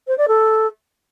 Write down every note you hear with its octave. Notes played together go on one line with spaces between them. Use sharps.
C5
D5
A4